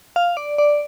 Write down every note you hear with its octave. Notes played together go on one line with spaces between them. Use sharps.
F5
D5
D5